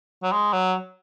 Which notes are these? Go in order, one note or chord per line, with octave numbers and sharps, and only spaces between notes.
F#3
G#3
F#3